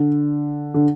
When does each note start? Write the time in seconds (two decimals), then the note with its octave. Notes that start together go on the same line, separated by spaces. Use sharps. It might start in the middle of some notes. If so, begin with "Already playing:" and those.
Already playing: D3
0.74 D3